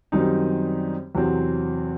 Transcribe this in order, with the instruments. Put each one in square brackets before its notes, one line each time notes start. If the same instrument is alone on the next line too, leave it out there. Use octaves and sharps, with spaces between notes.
[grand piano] F#2 D#3 G3 C4 D#4
E2 C3 F#3 C4